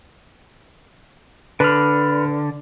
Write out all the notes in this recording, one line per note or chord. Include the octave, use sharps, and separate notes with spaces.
D3 B4 B5 F6